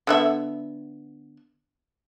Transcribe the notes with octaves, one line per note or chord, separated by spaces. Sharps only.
D3 B3 E5